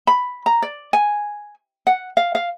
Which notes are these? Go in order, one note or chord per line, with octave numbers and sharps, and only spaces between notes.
B5
A#5
D5
G#5
F#5
F5
F5